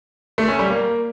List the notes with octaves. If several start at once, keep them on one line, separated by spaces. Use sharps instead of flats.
A3
C#4
G3
A#3